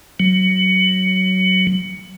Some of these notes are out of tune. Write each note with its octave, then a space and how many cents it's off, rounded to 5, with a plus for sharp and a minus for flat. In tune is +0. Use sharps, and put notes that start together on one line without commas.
F#3 +20